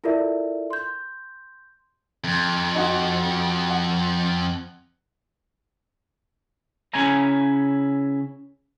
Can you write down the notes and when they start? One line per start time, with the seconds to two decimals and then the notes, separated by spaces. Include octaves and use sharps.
0.04 E4 F4 A4 A#4 D5 E5
0.70 C6 G6
2.24 F2
2.75 D#4 F#4
3.70 F#5
6.94 C#3 C#4 E4 G#5 A#5